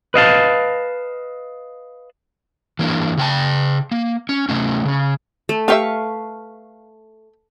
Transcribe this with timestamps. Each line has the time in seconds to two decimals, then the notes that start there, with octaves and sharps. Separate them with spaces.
0.14 B4 D#5 F5 A5
2.79 E3 A#3 D4
3.17 C#3 G5 A5
3.92 A#3
4.29 C#4
4.49 C3 A3 C#4
4.85 C#3 C#4
5.49 A3
5.68 A3 G4 B4 E5 F5 C#6